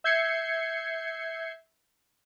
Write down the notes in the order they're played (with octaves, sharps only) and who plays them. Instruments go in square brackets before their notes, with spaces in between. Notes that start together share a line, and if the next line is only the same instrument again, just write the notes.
[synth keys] E5 G6 G#6 C7 C#7